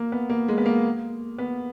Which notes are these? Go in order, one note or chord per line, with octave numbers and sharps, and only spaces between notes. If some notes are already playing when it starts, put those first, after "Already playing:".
Already playing: A#3
B3
A#3
G#3
B3
A#3
B3